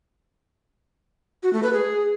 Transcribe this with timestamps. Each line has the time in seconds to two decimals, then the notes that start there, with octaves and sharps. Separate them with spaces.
1.43 F#4
1.53 A3
1.63 B4
1.73 G#4